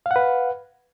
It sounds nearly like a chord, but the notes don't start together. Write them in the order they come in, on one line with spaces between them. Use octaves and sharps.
F5 F#5 B4